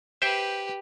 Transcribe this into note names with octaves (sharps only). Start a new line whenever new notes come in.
G4 B4 C5 E5 G5